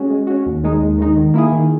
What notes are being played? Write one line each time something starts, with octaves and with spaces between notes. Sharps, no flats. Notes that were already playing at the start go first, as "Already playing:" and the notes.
Already playing: G#3 C#4 F#4
G#3
C#4 F#4
D#2
D#3 G#3 D#4
D#2
D#3 G#3 D#4
D#3
A#3 E4 G#4
D#3